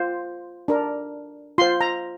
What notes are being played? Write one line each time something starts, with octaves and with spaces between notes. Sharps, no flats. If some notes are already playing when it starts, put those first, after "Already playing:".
Already playing: F4 C5
D4 A#4
F4 C5 C6
A#5